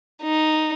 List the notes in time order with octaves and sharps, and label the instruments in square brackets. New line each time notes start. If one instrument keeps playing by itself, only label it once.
[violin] D#4